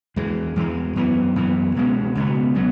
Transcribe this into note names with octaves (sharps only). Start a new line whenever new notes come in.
E2 E3 G#3
E2 E3 G#3
F#2 E3 B3
F#2 E3 B3
C#2 B2 G#3 B3
C#2 B2 G#3 B3
B2 F#3 B3